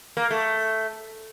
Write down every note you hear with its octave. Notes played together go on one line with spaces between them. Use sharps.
A#3
A3